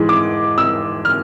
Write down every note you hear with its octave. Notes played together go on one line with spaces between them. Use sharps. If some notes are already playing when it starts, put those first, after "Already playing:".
Already playing: G#2 E3 G#3
D6
E6
F6